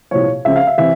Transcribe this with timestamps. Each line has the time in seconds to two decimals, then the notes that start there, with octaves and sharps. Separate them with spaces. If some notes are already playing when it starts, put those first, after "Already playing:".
0.11 C2 A#2 F3 C#5
0.45 C#2 C#3 F3 E5
0.56 F5
0.67 E5
0.78 C3 E3 E5